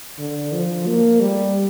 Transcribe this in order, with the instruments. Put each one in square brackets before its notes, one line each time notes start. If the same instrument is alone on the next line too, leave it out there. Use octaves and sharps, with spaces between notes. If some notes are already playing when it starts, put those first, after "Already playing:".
[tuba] D3
F3
A#3
G3